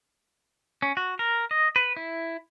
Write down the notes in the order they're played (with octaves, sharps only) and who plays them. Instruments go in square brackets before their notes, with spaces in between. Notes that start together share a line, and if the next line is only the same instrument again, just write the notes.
[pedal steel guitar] C#4
F#4
A#4
D#5
B4
E4